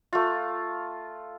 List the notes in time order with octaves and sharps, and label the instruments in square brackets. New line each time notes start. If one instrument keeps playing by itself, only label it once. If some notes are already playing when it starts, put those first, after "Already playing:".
[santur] A3 F4